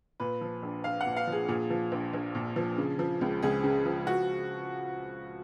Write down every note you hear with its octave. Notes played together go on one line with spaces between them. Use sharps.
A#2 B4
F3
A#1
A#1 F5
F#5
A#2
F5
F3 G#4
A#2 G#4
F3
A#1
A#1
A#2
F3
C#3
F3
C#2
C#2 G#4
C#3
F3
F#4